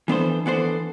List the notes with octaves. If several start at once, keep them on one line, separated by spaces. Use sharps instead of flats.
E3 B3 D4 A4 C5
E3 B3 D4 A4 C5